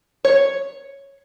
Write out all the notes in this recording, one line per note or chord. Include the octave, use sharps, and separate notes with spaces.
C#5